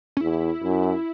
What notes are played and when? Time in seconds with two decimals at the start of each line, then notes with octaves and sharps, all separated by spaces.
0.17 C#4
0.21 E2 E4
0.64 F#2